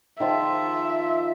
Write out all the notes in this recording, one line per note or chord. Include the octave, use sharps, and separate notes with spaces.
D#3 F3 F4 E5